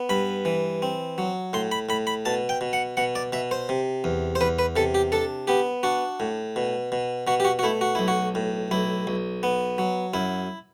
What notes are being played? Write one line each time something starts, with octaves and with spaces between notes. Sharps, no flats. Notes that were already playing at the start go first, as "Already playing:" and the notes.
Already playing: B3
G2 B5
E3
C4
F#3
A2 C6
B5
A2 B5
B5
B2 A5
G5
B2
F#5
B2 F#5
D5
B2 E5
C5
C3
E2
C5
E2 B4
B4
C3 A4
G4
D4 A4
B3 G4
D4 F#4
A2
B2
B2
B2 F#4
G4
F#4
F#4
A3 E4
F#4
B1 E4
F#4
A2
B1 E4
B1
B3
F#3
F#2 E4